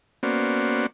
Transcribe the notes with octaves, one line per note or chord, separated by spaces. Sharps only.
A#3 B3 C#4 F#4 C5 D5